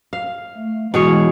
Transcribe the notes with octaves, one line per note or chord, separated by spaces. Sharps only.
F5
A3
B2 E3 G#3 E4 G#4 C#5